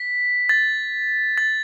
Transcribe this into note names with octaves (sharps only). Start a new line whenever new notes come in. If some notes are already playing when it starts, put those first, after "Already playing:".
Already playing: B6
A6
A6